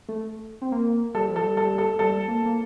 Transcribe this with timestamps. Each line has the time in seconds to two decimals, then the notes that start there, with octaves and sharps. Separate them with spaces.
0.08 A3
0.62 C4
0.72 A#3
1.14 G3 A4
1.28 F3
1.36 A4
1.40 G3
1.57 A4
1.78 A4
1.99 G3 A4
2.28 A#3
2.46 A#3